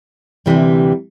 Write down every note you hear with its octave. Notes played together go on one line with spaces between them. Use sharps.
D2 C3 E3 G3